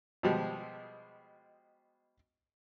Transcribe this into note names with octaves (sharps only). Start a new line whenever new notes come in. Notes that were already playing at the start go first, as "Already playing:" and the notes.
B2 F3 G3 G#3